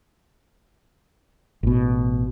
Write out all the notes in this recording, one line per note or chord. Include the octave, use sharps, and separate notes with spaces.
A1 B2